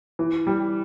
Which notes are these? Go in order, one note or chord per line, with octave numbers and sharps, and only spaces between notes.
E3
G3